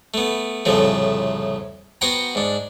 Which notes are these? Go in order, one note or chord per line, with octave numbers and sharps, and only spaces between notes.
A3 B3
C2 F2 A2 C#3 F3 A3
B3 F#4 C5 F#5 G5 A#5
G#2 D4